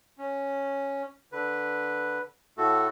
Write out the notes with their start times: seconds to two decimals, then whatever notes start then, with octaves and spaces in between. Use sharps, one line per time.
0.18 C#4
1.32 D3 B4
2.58 A2 A3 F#4 A4